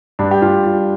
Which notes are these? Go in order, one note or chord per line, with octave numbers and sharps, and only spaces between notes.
G2 D4
G4
G2 F4
G2 F4